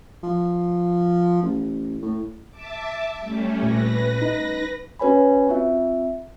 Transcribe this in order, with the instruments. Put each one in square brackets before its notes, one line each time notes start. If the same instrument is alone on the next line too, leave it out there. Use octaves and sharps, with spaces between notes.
[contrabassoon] F3
A1
A2
[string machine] E5 A5 D6
G3 A3 C#4
[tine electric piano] A#2 [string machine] B4 A#6
[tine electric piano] D#4
[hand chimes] C#4 F#4 B4 C#5 G#5 B5
C4 F4 E5